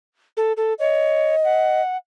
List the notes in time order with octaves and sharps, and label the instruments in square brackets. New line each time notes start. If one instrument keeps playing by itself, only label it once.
[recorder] A4
A4
[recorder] C#5 [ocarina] D#5
[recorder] F#5